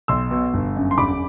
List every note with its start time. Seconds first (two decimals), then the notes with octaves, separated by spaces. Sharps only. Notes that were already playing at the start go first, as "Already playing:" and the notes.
0.08 B1 C6 E6
0.31 B2
0.54 G1
0.76 F#2
0.91 C6
0.98 E1 B5 D6